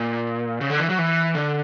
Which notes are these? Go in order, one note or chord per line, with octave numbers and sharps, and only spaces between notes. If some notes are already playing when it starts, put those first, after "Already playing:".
Already playing: A#2
C#3
D3
E3
F#3
E3
D3